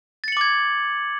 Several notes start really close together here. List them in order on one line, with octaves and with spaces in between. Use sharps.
A6 C#7 F#7 D6 G#6